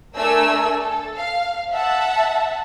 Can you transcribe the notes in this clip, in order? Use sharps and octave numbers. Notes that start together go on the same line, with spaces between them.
A3 D4 A#4 G#5 E6
A4
F5
E5 F#5 A5